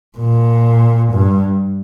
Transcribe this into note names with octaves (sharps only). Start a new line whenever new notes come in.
A#2
G2